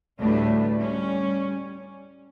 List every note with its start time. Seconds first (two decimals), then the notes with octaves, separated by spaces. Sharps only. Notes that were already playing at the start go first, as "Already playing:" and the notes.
0.18 D2 A2 G3 A3 D4 B4
0.78 G3 C#4